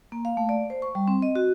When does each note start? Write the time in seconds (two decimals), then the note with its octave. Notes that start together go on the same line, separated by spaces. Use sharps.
0.12 A#3
0.25 F5
0.37 A3
0.49 D5
0.70 C5
0.82 C#6
0.95 G3
1.08 C4
1.22 D#5
1.35 F#4